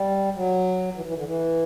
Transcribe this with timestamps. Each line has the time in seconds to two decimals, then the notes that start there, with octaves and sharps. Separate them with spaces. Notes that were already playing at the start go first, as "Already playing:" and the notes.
Already playing: G3
0.36 F#3
0.95 E3
1.05 E3
1.15 D3
1.25 E3